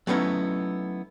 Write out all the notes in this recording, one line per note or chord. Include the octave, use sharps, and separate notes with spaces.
F#3 A3 B3 C#4 D#4 E4